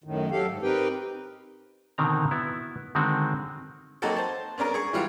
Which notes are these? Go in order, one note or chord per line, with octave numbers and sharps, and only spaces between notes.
F#2 A2 D#3
F#3 G4 A4 F5
G#2
C4 D#4 G4 A#4 B4 G5
B2 D3 D#3 C4 A#5
B3 E4 F#4
D3 D#3 G#3 C4 F#4
F#3 A#3 C4 D#4 F#4 A4
C5 A5
B3 C#4 D4 A#4
G#4 C#6
E3 G3 F4 F#4